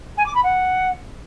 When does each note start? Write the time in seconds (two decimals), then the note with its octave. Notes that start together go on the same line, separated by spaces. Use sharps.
0.17 G#5
0.26 D6
0.35 B5
0.43 F#5